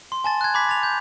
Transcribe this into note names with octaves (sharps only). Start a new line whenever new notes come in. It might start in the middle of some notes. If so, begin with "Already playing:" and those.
C6
G#5 A5 A6
F#6 G#6
B5 D6 G#6 B6
A6 F7
G6